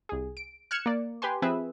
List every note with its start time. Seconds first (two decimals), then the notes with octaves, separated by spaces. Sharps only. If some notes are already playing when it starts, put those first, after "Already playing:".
0.09 C2 G#4
0.37 D7
0.71 F6 F#6 G#6 C#7 E7
0.86 A#3 D5
1.22 G4 B4 G#5 C6
1.42 F3 C4 G#4 B4 E5